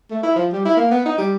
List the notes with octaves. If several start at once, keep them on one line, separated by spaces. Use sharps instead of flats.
A3
E4
F3
G3
E4
A#3
B3
D#4
G3